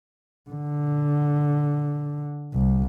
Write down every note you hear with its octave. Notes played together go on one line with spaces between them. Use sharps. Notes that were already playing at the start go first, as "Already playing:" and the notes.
D3
C2